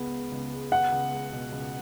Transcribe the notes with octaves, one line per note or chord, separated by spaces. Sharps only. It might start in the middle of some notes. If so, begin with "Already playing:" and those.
Already playing: C#2 G#3 B3
G#3
C#2
G#3
B3 F#5
C#2
G#3
B2
C#2